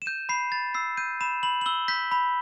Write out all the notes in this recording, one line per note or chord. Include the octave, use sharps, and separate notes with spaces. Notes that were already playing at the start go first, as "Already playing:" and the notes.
E7
G6 D#7
B5 C7
B5 A6
E6 C7
G6 D#7
B5 E7
B5 F#7
F#7
E6 G7
G6 B6
B5